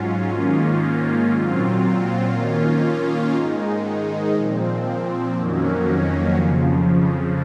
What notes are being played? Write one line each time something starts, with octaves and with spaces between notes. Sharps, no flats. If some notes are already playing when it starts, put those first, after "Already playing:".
Already playing: G#2 F#3 C#4 F4
G#2 D#3 A#3 C#4 F4
A#2 F#3 C4 F4
D#3 A#3 C#4 F4
G#2 D#3 G#3 D#4
A#2 F3 C4
F2 D#3 F#3 A#3 C#4
F2 C#3 F3